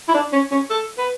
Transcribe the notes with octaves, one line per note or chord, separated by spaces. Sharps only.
E4
D4
C#4
C#4
A4
B4